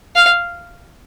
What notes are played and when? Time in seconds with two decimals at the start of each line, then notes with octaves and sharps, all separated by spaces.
0.16 F5